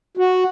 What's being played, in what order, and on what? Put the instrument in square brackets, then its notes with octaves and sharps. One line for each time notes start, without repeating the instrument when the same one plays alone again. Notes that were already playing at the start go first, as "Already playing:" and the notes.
[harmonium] F#4